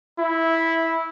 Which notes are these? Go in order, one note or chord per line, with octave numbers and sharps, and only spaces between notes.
E4